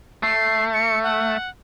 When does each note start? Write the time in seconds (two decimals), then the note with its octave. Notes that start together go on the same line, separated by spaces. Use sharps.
0.23 A3 C7
0.74 C#7
1.03 F#5